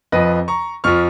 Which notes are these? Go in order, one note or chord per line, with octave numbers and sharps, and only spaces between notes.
F2 F3 B4 D#5
A#5 C#6
F2 F3 C#6 F6